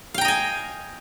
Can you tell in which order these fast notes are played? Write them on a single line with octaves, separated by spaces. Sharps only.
F5 G5 A#5 D#5 G#5